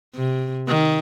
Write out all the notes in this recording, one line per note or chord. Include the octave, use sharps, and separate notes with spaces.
C3
D#3